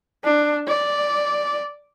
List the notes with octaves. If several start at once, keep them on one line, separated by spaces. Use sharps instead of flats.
D4
D5